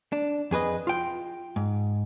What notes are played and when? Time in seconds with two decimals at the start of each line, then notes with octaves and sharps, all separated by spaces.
0.12 D4
0.51 F2 G#4 B4 D#5
0.87 F4 G5
1.56 G#2